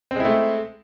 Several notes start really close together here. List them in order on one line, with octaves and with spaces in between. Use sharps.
C4 G#3 E4 A3